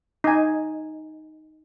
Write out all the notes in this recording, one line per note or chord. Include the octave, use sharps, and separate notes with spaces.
D#4 G#5